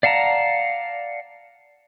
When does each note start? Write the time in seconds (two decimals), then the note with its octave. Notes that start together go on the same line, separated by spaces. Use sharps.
0.03 D5 F5 F#5 A5 A#5